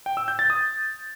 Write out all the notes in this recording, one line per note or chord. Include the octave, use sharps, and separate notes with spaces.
G5
E6
G6
A6
D#6